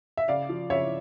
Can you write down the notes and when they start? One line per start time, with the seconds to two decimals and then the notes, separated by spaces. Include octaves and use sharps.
0.17 E5
0.28 C#3 D5 F5
0.49 F3
0.70 C#3 C#5 E5